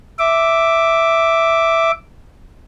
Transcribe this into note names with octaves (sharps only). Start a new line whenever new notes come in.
E5 D6